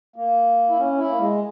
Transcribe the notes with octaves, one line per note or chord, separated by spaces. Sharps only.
A#3
E4
C#4
E4
A#3
G#3